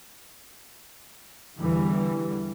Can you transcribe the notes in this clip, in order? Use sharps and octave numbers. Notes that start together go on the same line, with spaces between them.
E2 D3 E3 G3